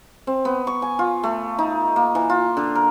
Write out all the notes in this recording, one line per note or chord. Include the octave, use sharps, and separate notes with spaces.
C4
B3
C#6
G#5
F4
A3
D#4
A#3
E3
F4
D3
A#4